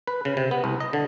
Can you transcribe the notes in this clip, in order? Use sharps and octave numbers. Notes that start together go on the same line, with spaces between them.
B4
C#3
C3
B3
C2
D#5
D3